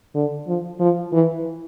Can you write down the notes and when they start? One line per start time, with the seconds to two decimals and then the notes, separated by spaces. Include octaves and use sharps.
0.15 D3
0.47 F3
0.80 F3
1.13 E3